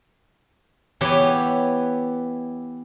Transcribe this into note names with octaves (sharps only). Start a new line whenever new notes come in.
E3 B3 E4 G4 C#5